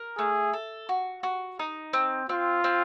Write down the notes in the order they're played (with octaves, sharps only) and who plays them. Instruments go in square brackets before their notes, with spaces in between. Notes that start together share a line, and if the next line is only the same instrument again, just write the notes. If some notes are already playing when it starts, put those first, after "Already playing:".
Already playing: [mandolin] A#4
[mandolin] A3 [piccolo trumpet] G#4
[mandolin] A4
F#4
F#4
D#4
C4
[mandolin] C4 [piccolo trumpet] F4
[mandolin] C4